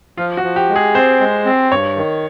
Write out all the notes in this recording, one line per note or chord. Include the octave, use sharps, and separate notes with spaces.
F3 F4
F#4
F3
G4
G#3
G#4
C4 C5
G#3
C4
G2 C#5
D#3